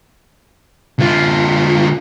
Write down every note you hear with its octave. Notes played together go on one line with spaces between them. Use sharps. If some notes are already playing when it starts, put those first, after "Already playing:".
D3 F4